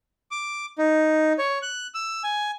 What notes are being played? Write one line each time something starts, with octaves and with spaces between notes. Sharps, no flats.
D6
D#4
C#5
F#6
E6
G#5